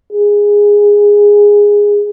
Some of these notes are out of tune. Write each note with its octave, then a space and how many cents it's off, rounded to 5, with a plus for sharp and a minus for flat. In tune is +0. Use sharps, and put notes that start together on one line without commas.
G#4 -10